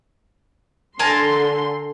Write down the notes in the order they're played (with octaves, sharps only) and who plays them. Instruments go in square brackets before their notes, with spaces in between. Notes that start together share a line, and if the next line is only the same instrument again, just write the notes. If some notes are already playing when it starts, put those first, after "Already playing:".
[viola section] D3 C6 [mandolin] A#4 G#5 A5